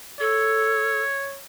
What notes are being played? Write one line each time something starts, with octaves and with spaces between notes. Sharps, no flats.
A4 C#5